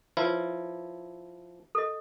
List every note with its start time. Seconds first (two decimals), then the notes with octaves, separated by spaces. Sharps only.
0.17 F3 E4 B4 C#5
1.75 A4 D#5